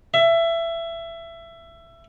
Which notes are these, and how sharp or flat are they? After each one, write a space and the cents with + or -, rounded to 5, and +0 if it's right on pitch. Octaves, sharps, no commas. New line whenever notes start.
E5 +20